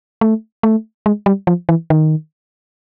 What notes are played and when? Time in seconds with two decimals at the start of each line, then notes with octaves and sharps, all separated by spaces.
0.21 A3
0.63 A3
1.06 G#3
1.26 G3
1.47 F3
1.69 E3
1.90 D#3